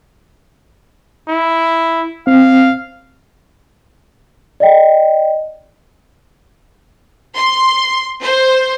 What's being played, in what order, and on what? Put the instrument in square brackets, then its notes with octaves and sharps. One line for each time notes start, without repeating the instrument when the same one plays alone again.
[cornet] E4
[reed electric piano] C4 [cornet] F5
[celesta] D5 D#5 G5
[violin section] C6
C5